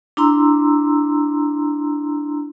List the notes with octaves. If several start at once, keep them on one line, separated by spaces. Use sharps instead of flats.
D4 E4 A#5 C6 E6